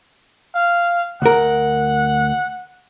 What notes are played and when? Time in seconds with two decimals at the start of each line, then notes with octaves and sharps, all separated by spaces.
0.55 F5
1.22 D2 A#4 F#5